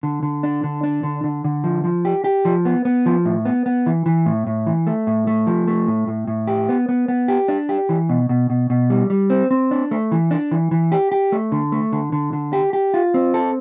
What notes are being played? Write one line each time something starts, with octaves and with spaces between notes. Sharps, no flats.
D3
D3
D4
D3
D4
D3
D3
D3
F3
F3
G4
G4
F3
B3
B3
F3
A2
B3
B3
E3
E3
A2
A2
E3
A3
A2
A3
F3
A3
A2
A2
A2
G4
B3
B3
B3
G4
D4
G4
E3
B2
B2
B2
B2
G3
G3
C4
C4
D4
A3
E3
D4
E3
E3
G4
G4
A3
D3
A3
D3
D3
D3
G4
G4
F4
C4
A4